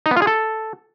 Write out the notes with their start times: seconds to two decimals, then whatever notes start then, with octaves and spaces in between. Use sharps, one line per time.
0.06 D#4
0.11 B3
0.16 F4
0.22 G#4
0.27 A4